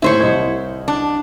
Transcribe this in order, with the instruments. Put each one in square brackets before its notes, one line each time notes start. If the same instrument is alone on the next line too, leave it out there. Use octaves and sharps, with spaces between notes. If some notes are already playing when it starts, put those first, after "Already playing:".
[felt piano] D#2 A2 [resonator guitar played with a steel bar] E4 C5 C#5
[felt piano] C2 D#5 G#6
[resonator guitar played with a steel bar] D4